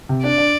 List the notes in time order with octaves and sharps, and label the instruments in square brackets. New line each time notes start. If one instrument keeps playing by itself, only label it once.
[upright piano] C3
[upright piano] D4 [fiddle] D5
[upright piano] D4